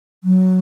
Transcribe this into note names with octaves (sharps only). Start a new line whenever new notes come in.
F#3